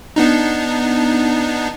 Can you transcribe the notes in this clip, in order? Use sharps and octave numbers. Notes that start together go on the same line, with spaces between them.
B3 D4 D#4